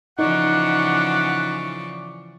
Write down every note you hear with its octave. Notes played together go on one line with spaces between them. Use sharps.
C#3 E3 F3 D#4 D5 F#5 C#6